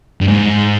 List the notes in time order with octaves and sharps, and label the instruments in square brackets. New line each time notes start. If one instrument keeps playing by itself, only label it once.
[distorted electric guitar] G2
G#2